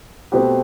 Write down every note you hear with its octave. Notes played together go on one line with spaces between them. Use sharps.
B2 A3 C4 G4 B4